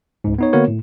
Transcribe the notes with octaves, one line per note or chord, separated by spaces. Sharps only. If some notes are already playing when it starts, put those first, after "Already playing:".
C#2 G#2
B3 D#4 C#5
D3 A#3 B3 F#4 A#4 C#5
A2